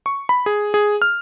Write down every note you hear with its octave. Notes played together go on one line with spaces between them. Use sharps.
C#6
B5
G#4
G#4
F6